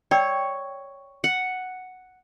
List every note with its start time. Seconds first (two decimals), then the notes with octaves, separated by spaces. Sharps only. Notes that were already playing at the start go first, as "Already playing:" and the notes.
0.11 C#5 D5 G5 E6
1.24 F#5